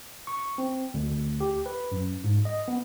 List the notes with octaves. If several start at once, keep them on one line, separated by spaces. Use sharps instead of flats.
C#6
C4
D2
G4
B4
F#2
G#2
D#5
B3